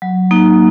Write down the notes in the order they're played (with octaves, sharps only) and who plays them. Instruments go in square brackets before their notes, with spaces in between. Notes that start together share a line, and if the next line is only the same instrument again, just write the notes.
[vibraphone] F#3
A#3 D#4